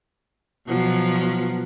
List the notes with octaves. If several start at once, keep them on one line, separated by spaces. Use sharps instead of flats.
B2 F3 F#3